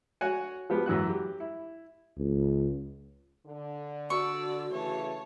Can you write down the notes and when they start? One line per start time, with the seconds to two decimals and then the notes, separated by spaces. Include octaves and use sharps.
0.21 F#4 C#5 F#5 G#5
0.70 F3 B3 G4
0.86 F#2 E3 F#4 F#6
1.09 G4
1.40 E4
2.17 C#2
3.46 D3
4.10 F#4 D5 C#6 E6
4.71 C#3 E3 A3 C#5 A5